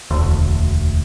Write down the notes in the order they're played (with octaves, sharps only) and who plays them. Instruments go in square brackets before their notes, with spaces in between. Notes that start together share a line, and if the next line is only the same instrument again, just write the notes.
[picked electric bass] E1 D2